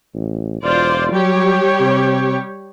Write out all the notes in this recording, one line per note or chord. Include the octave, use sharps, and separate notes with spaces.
A1
E1 F4 C5 D5
F#3 G3 G4 C#5
C3